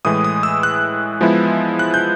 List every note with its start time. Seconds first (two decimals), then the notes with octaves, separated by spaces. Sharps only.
0.05 A2 E3 G#3 D#6
0.24 D#6
0.43 E6
0.63 F#6
1.21 F3 G#3 B3 E4
1.79 F#6
1.94 G6